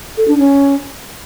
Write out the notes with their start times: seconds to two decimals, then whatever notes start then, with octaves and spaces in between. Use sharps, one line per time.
0.17 A4
0.28 D4
0.38 C#4